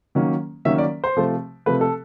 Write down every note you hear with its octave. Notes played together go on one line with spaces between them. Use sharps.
D#3 F#3 A#3 C#4
D#3 F#3 A#3 C#4 E5
D5
C5
C3 F3 A3
C3 F3 A3 B4
A4